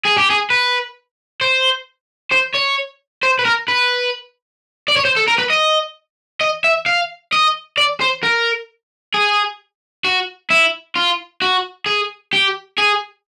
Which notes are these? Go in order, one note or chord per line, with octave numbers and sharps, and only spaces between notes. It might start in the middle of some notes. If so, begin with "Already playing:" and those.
G#4
G4
G#4
B4
C5
C5
C#5
C5
B4
A#4
B4
D5
C#5
C5
A4
A#4
B4
D#5
D#5
E5
F5
D#5
D5
C5
A#4
G#4
F#4
E4
F4
F#4
G#4
G4
G#4